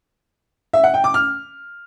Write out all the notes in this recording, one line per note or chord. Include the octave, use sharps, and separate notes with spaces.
E5
F#5
G5
D6
F6